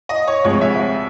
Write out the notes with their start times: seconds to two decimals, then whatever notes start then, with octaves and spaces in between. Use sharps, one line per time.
0.09 D#5
0.28 C#5
0.44 D2 C3 F3 G#3 C#5
0.61 E5